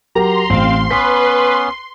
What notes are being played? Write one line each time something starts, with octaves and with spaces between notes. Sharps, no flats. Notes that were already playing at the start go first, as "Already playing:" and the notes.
F#3 G4 A#4 A#5 C6
A1 C4 F5
B3 C#4 B4 B6